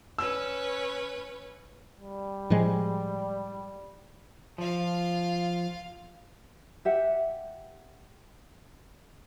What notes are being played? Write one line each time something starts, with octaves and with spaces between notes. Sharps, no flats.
C#4 B4 C#5 E6
G3
A2 F3 G#3
F3 F4 F5
G4 E5 F#5